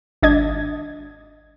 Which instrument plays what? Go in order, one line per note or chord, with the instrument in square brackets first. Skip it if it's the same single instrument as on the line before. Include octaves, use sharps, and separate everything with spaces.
[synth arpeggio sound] G#1 D4 D#5 G#6